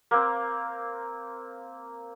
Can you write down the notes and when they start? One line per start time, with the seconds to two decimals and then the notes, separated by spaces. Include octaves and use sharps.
0.11 A#3 C4